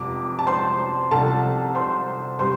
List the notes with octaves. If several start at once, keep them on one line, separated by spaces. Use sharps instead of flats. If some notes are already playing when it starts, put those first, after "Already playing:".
Already playing: F1 F2 C3 D6
A5
C5 C6
C2 C3 F3 C4 A4 A5
C5 C6
C3 G3 C5 C6